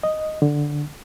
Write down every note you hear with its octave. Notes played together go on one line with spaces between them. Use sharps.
D#5
D3